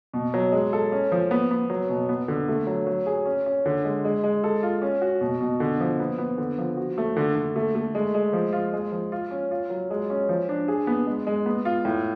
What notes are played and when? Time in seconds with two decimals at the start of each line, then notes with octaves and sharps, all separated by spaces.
0.14 B2
0.34 F#3
0.52 G#3
0.73 A4
0.92 C#4
1.12 F3
1.31 B3
1.51 B3
1.70 F#3
1.89 B2
2.09 B3
2.28 D3
2.48 A3
2.67 F#3
2.87 F#3
3.06 G#4
3.26 C#4
3.46 C#4
3.66 D3
3.84 G#3
4.05 G#3
4.23 G#3
4.44 A4
4.63 F4
4.82 C#4
5.01 F#4
5.21 B2
5.41 B2
5.60 D3
5.80 F3
6.00 B3
6.18 B3
6.38 D3
6.58 F3
6.77 F#4
6.98 A3
7.16 D3
7.36 D3
7.56 A3
7.75 A3
7.95 G#3
8.14 G#3
8.33 F3
8.53 F4
8.73 G#3
8.92 F3
9.12 F4
9.31 C#4
9.51 F4
9.70 F#3
9.90 G#3
10.10 C#4
10.29 F3
10.49 D4
10.68 G#4
10.87 B3
11.07 G#3
11.27 G#3
11.46 B3
11.65 F4
11.85 A2